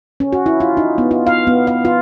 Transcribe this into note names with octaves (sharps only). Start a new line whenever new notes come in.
C#4
F#4
E4
F4
D#4
B3
F4
F5
B3
F5
F4